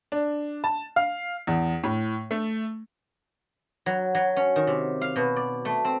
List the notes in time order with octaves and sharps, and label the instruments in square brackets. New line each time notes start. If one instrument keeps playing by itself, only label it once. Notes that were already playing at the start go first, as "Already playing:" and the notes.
[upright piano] D4
A5
F5
E2
A2
A3
[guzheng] F#3
F#3
C#4
D#3
C3
F5
B2
D5
A3
C4